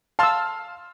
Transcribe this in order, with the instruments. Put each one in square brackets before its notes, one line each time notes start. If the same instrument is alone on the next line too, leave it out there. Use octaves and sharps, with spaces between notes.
[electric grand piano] F5 C6 F6 [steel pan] A5 E6